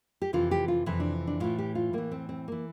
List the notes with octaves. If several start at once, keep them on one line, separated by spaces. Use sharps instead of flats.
G4
F2 C3 E3 F4
G4
F4
F2 C3 E3 E4
D4
D4
A2 E3 F4
G4
F4
A2 E3 A#3
C4
C4
E3 A#3